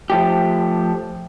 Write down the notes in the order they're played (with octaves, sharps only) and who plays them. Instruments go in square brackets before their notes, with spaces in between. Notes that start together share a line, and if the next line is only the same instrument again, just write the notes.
[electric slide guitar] F3 A3 G4